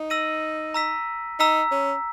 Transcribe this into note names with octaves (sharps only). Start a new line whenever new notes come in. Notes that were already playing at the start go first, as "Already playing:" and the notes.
Already playing: D#4
E6 A#6 D#7 F#7
A#5 E6 B6
D#4 A#5 E6 B6
C#4